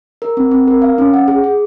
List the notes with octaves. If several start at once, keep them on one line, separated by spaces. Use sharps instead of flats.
A#4
C4
C4
A#4
F5
C#4
F#5
G#4
G#4